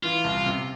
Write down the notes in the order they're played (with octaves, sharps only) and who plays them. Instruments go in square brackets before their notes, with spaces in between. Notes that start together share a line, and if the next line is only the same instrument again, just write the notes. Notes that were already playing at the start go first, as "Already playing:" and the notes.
[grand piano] E3 [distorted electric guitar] F4
[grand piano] C2
C3